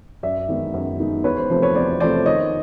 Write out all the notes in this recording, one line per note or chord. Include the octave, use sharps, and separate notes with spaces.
F#2 D5 E5
D#3 G#3 B3 D#4
F#2
D#3 G#3 B3 D#4
E2 B4 C#5
C5
C3 F3 A3 C5
B4 C#5
E2 C5 D5
C3 F3 A3 C5 D5
D#3 C#5 D#5